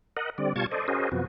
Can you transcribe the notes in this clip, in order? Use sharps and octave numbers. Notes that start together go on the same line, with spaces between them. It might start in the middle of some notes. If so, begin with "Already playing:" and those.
A#4 D#5 F#5
D3 G3 C4 D5
B2 G3 F4 A5 C#6 G#6
A4 C5 D5 D#5
C#4 F#4 G#4 A#4 C5 D#5
F#2 C3 F3 B3 F#4